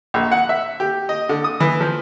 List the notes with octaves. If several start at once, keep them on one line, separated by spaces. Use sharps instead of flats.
A#1
F#5
E5
G4
D#5
D3
D#6
E3
F3